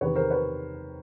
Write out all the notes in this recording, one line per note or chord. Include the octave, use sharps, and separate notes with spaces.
E2 C3 D#3 B4 C#5
A#4 C5
B4 C#5